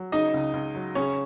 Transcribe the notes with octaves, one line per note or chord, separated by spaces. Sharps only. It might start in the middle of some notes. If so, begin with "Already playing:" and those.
Already playing: F#3
C#3 D#4 D#5
C#2
C#2
F#3
C#3 C#4 C#5